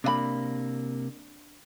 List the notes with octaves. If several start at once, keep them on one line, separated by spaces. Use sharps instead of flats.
C3 A#3 D4 D#5 B5